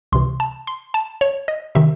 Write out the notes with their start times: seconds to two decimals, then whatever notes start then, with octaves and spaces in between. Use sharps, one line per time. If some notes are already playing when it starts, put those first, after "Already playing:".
0.12 C#2 C3 E3 C6
0.40 A5
0.67 C6
0.94 A5
1.21 C#5
1.48 D#5
1.75 C3 D#3 E5